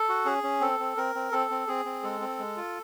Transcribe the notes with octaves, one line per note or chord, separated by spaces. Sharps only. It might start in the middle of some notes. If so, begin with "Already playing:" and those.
Already playing: A4
F#4
C#4 G#4
C#4
C4 A4
C4
C4 A#4
C4
C4 A4
C4
C4 G#4
C4
G#3 A4
C4
G#3
F4